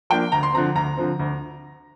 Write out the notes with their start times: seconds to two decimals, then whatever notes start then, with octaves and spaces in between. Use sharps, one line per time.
0.10 F3 A#3 D4 G5
0.32 D2 A#5
0.43 C6
0.53 D3 F3 C4 A#5
0.75 D2 A#5
0.97 D3 F3 C4
1.19 D2